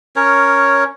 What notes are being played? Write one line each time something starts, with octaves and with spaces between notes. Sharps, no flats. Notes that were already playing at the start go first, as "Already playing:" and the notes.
C#4 A#4 C#5